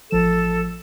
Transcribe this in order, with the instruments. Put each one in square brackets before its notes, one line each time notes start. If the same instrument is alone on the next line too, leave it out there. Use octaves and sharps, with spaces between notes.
[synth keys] A1 F3 E7 [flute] A4